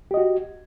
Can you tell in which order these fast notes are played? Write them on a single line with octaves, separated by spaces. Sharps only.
G4 D#5 F#4